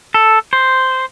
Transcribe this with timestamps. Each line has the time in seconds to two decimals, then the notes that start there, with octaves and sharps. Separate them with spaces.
0.14 A4
0.53 C5